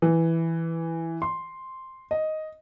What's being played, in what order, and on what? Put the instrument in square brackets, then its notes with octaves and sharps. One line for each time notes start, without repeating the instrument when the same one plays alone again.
[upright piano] E3
C6
D#5